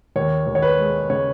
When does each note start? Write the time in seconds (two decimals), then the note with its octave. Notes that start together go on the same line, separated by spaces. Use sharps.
0.16 D#2 C#5
0.47 D#2
0.55 C#5
0.62 B4
0.78 G#3
1.10 C#3 C#5